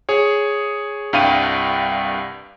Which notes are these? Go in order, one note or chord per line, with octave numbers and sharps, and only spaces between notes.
G#4 C#5
C2 G2 F5 G5 D#7